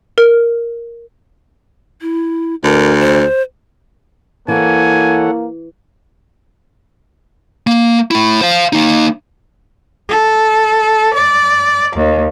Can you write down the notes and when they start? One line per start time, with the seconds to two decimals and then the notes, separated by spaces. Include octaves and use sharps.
0.18 A#4
2.01 E4
2.64 D2 A#4
3.00 C5
4.48 E3 A#3 A4 C#5 F#5 G#5
7.67 A#3
8.11 A3 E4
8.41 C5 F5
8.73 A#3 D#4
10.09 A4
11.15 D5
11.97 D#2